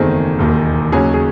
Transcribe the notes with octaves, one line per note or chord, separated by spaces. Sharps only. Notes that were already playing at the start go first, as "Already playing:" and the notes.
Already playing: F#1 E2 D#3 A3 C4 G#4
E1 D#2 D#3
D#2 C#3 F#3 C#4 G#4
G#4